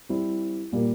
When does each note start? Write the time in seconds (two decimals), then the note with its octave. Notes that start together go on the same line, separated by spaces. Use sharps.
0.09 G3 C4 E4
0.72 A#2 G3 A#3